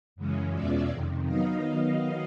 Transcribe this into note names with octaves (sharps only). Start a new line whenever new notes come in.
F#2 C#3 E3 G#3 C#4
E2 B2 G#3 C#4 F4 D5 E5
F2 C3 D#3
D#3 F#3 B3 D#4 D#5 F5
D#3 F#3 B3 D#5 F5